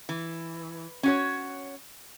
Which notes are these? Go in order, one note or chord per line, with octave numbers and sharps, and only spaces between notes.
E3
C#4 F#4 C#5